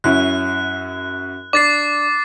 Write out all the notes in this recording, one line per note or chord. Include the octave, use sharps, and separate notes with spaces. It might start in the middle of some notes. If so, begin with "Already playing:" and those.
F#2 C#4 E4 F#6
D4 D6 A6 C7